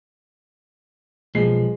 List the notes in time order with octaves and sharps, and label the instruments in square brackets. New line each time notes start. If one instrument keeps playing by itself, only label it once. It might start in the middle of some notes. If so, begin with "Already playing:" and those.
[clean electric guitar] B1 F3 [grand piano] G#3 C7